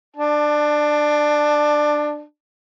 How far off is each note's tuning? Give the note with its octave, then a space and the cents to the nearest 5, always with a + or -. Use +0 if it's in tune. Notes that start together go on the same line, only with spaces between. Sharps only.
D4 +20 A5 +0